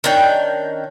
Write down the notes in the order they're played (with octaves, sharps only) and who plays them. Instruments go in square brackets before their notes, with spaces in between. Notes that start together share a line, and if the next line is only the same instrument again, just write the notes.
[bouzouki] D#3 C#4 D4 G5